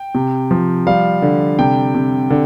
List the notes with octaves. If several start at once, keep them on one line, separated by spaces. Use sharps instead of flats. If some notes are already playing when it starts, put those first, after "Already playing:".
Already playing: G5
C3
F3
G3 F5
D3
C3 G5
C3
D3